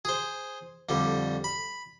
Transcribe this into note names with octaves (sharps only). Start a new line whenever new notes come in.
G#4 C5
F2 D3 G3
B5